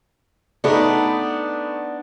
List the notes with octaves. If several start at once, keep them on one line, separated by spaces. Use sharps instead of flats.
A3 B3 D4 D#4